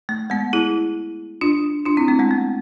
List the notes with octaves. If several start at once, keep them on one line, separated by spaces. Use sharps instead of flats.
A3
G#3 B3
E4 G#4
D4 F4
D4 F4
C4 E4
A3 C4
G#3 B3
A3